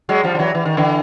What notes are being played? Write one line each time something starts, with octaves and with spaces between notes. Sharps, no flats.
F#3 G#3
F3 G3
F3
E3 F#3
E3
D#3
D3 E3